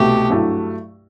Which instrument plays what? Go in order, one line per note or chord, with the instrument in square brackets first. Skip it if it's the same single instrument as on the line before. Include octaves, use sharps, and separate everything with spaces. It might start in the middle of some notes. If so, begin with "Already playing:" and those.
Already playing: [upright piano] C2 B2 A3 [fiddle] G4
[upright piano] G2 F#3 A3 E4